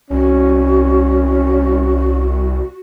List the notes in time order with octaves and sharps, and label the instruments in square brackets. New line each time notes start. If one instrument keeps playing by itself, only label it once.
[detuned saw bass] C2 [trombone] C#4 [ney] F#4